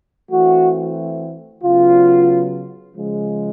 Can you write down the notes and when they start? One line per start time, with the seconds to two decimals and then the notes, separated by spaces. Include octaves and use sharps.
0.30 E3 A3 C4 F#4
1.63 C#3 F#3 B3 F4
2.95 C#3 F3 G#3